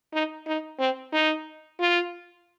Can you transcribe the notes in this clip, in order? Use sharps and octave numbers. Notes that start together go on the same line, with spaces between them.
D#4
D#4
C4
D#4
F4